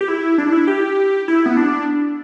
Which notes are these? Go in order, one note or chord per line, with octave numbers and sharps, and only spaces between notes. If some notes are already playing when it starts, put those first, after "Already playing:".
G4
E4
D4
E4
G4
E4
B3
D4